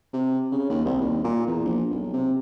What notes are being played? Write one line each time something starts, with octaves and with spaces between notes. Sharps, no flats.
C3
C#3
D#2
C2
D#2
A#2
E2
A#1
B1
C3